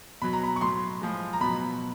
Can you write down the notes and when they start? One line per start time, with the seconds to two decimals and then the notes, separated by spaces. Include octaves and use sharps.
0.22 B2 F#3 B5
0.33 A#5
0.44 B5
0.56 C#6
0.61 A2 F#3 C6
1.01 A2 F3 G#3
1.33 A#5
1.41 B2 F#3 B5